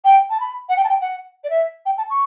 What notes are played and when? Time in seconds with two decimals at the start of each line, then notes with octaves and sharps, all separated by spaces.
0.05 G5
0.30 A5
0.40 B5
0.69 F#5
0.77 G5
0.84 A5
0.89 G5
1.01 F#5
1.44 D5
1.50 E5
1.86 G5
1.98 A5
2.10 C#6